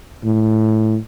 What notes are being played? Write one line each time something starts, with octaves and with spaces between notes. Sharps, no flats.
A2